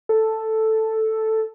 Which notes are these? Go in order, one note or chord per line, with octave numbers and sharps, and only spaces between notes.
A4